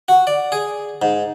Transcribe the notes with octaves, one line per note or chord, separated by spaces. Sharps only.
F#4
D5
G#4
G#2